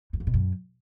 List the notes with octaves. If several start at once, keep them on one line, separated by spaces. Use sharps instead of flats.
F#2
F2
B2
F#2